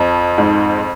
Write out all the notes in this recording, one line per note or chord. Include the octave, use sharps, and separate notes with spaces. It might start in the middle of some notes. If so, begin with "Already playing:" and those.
Already playing: F2 F3
G#2